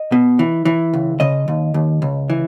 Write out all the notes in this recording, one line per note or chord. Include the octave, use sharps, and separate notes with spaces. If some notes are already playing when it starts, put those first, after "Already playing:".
Already playing: D#5
B2
E3
E3
C#2
C#3 D#5
D#2
D#2
C#2
E3